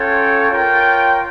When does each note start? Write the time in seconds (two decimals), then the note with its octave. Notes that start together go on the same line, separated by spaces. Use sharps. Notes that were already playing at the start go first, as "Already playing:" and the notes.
Already playing: C#4 F4 A4 C#5 G5
0.51 F4 A#4 C#5 G5